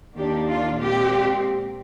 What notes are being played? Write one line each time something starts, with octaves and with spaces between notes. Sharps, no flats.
D#2 D#3 A#3 D4 G4
F4
A#2 G#3 C4 G4